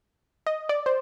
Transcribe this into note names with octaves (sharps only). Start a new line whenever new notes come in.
D#5
D5
C5